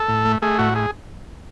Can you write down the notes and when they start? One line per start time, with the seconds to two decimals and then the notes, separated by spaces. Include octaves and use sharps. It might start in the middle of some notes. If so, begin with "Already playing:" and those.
Already playing: A4
0.09 A2
0.25 A3
0.42 A3 G#4
0.59 A2 F#4
0.76 G#4